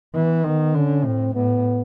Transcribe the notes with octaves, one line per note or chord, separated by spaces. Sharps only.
E3 B3
D#3 B3
D3 C#4
A2 C4
A2 B3